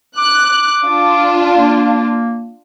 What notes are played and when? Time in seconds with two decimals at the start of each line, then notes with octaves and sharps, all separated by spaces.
0.18 D6 F#6
0.85 D4 F4
1.56 A#3